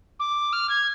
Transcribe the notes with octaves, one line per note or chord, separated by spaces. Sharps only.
D6
F6
G#6